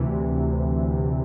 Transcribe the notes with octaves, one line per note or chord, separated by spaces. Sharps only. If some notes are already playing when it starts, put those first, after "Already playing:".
Already playing: D2 C3 E3